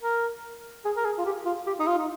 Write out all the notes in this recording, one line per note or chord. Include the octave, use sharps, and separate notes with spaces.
A#4
G#4
A#4
G#4
F4
G4
F4
G4
D#4
F4
D#4